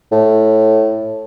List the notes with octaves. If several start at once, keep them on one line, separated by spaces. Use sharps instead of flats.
A2